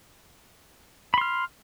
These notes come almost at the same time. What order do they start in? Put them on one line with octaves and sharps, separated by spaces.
B5 C6 F6